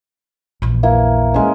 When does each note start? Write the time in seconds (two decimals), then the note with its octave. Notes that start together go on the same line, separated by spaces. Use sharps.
0.62 A#1 E2
0.83 A#3 E4
1.34 G#3 C#4